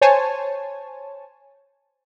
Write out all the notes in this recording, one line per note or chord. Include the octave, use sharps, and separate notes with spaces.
C5 C#5 G#5 A5